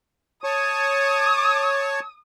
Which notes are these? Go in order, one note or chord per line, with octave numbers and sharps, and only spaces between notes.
C#5 A5 C#6 D#6